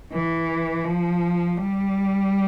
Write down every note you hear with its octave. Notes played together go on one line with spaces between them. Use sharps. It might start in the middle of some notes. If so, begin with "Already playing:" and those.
E3
F3
G3